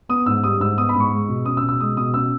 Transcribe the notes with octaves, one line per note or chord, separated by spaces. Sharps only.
B3 D#6
G#2 E6
G3 D#6
G#2 E6
B3 D#6
B5
G#2
C#6
G#3
B2
C#4 D#6
E6
B2
E6
G#3 D#6
B2 D#6
C#4 E6